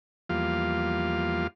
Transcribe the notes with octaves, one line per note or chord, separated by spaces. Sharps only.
E2 F3 G3 A#3 F4 F5